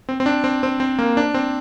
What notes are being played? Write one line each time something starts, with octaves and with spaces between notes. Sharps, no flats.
C4
C4
D4
C4
C4
C4
A#3
D4
C4